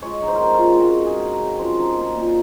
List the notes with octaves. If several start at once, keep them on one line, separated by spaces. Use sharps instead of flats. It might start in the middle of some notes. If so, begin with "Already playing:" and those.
G#3 C#5
D#4
C5
A#4
C4 C5
F4
C#3
G#3 F#4
D#4
G#4
C4
A#4
C#3
F3 C5
D#4
A#3
A#2